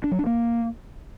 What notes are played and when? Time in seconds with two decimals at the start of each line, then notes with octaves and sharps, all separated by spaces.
0.04 D4
0.11 F#3
0.19 D4
0.26 A#3